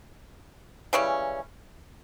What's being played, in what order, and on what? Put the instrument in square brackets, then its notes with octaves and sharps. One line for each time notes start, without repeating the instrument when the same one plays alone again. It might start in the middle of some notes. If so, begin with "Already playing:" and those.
[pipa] C#3 E3 G3 C#4